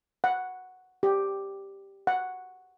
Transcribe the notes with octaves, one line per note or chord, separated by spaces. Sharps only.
F#5
G4
F#5